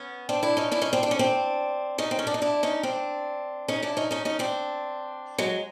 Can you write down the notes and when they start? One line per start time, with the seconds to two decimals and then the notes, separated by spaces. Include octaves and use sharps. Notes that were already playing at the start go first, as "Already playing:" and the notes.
Already playing: B3 C#4
0.29 C4 D4
0.43 D4 E4
0.57 C#4 D#4
0.72 D4 E4
0.82 C#4 D#4
0.93 C4 D4
1.03 D4
1.11 C#4
1.19 C4 D4
1.98 C#4 D#4
2.11 C4
2.19 C#4
2.27 D4
2.34 D#4
2.42 D4 E4
2.63 C#4 D#4
2.83 C4 D4
3.68 C#4 D#4
3.83 D4 E4
3.97 C#4 D#4
4.11 C#4 D#4
4.25 C#4 D#4
4.39 C4 D4
5.38 F#3 G#3